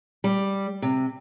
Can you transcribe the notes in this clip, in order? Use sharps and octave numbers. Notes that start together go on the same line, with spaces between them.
G3
C3